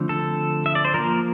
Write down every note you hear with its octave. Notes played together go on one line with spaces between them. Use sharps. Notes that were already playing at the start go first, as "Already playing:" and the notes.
Already playing: D3 F3 A3 C4
A4
E5
D5
C5
F3 A#3 A#4